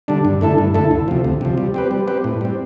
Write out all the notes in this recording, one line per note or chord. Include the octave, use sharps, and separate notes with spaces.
D3 G3 D4
G2
D3 A3 E4 A4
G2
D3 A3 E4 A4
D2
C3 F3
D2
C3 F3
G3
C4 G4 B4
G3
C4 G4 B4
A2
G3 C4